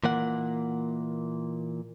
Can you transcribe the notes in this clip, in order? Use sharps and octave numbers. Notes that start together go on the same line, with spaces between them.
A#2 E3 A#3 F#5